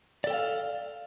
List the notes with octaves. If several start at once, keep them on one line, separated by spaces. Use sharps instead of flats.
A4 D5 F5 G5